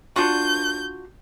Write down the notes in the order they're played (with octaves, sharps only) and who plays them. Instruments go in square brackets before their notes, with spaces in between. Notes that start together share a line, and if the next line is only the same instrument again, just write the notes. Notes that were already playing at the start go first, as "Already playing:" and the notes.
[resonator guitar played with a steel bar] D4 F4 F#4 [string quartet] G6